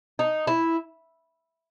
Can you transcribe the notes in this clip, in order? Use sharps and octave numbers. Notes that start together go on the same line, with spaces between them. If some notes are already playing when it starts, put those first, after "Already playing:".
D#4
E4